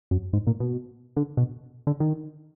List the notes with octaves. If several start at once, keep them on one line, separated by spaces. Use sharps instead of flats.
F#2
G#2
A#2
B2
D3
B2
D3
D#3